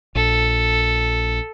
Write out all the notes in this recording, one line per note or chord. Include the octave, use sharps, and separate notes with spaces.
A#1 A4